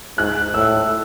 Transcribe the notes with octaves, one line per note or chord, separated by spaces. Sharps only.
G#2 F#6
A2 E6